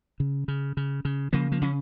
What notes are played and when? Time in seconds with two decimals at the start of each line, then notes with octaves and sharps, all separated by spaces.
0.20 C#3
0.48 C#3
0.77 C#3
1.05 C#3
1.33 C#3 F3 A#3
1.52 F3 A#3
1.61 C#3 C#4